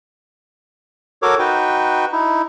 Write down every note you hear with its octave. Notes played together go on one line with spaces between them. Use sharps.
F#4 A4 A#4 C#5 D6
D#4 F#4 B4 G5
D#4 E4